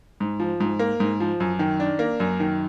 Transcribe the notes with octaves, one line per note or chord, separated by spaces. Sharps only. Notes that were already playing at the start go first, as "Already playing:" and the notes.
G#2
F3
G#2
A#3
G#2
F3
F#2
D#3
D4
A#3
F#2
D#3